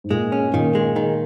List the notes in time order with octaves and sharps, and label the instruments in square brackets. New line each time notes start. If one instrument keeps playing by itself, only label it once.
[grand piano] G#2
[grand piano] A#2 [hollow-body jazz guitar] G#3
[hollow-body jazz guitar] C#4
[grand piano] A#2 [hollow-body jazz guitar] D#3
[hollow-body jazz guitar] G#3
D#3